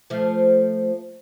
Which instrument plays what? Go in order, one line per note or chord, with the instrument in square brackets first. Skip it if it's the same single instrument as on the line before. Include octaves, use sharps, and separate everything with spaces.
[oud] F3 A3